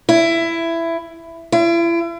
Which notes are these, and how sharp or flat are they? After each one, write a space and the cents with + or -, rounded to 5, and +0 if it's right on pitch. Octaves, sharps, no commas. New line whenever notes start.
E4 +15
E4 +40